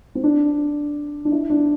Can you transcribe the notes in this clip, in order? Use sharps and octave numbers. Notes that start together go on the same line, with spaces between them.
C4
D4
D4
E4
D4